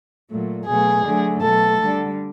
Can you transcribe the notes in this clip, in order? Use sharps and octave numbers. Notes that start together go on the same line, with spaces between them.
A#2 F#3 A3
B2 F#3 A3 G#4
D3 F#3 A3
B2 F#3 A3 A4
D3 G3